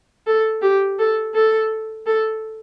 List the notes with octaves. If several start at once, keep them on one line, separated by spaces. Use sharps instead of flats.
A4
G4
A4
A4
A4